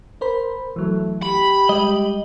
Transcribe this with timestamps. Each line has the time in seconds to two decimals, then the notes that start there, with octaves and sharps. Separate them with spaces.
0.21 A#4 C5 B5
0.76 E3 F#3 A3
1.23 G4 B5
1.69 G3 G#3 D#5